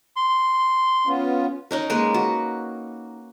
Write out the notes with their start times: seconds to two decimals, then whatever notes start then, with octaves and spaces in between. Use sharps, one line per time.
0.16 C6
1.07 B3 C#4 F4
1.71 C#4 D#4 A#4
1.90 G#3 A#3 A#4 B4
2.14 F#4